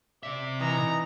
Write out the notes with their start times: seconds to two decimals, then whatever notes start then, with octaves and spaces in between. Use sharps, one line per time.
0.23 C3 D5 E5
0.60 E3 D#4 A#5